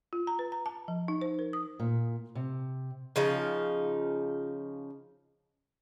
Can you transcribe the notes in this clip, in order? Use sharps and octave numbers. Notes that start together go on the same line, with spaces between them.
F4
A#5
B4
A#5
A5
F3
D#4
C5
A#4
D#6
A#2
C3
C#3 F3 D#4